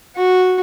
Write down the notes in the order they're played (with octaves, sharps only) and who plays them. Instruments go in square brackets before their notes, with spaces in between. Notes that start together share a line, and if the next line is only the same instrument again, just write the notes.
[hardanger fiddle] F#4